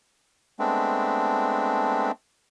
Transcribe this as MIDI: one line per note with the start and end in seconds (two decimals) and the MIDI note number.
0.59 2.11 56
0.59 2.11 57
0.59 2.11 59
0.59 2.11 60
0.59 2.11 62